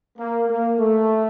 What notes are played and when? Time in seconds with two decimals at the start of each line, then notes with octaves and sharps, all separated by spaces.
0.18 A#3
0.48 A#3
0.79 A3